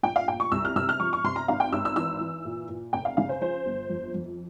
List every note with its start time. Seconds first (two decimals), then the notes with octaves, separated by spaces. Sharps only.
0.03 A#1 G5
0.16 F5
0.28 A#2 G5
0.40 C#6
0.51 C2 E6
0.65 F6
0.76 C3 E6
0.89 F6
1.00 F3 C#6
1.13 C#6
1.24 C3 C6
1.36 A#5
1.48 G#1 F5
1.60 G5
1.73 G#1 E6
1.85 E6
1.96 E3 E6
2.20 E3
2.45 A#2
2.69 A#2
2.93 F1 G5
3.05 F5
3.17 C#3 F5
3.29 C5
3.41 F3 C5
3.66 G1
3.90 F2
4.14 F2